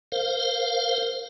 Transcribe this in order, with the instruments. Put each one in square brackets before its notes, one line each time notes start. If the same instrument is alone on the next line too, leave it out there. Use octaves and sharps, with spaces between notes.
[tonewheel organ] A#4 C5 F5